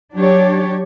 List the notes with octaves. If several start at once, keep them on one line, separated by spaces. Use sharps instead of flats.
F#3 D4 G4 C#5